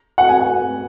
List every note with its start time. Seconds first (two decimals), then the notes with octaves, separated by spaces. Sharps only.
0.18 F#5
0.29 G#5
0.40 F#5